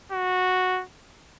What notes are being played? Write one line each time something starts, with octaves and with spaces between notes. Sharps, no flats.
F#4